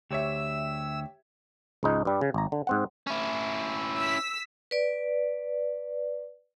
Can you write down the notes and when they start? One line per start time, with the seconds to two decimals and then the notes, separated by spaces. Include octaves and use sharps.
0.11 D2 G4 C#5 E5 E6
1.83 C#2 G#2 D#4
2.05 G2 G3
2.21 C#3
2.34 G#1 A#5
2.52 D3
2.67 G#2 C4 F#5
3.07 C#4 E4
3.99 E6 B6
4.71 B4 D5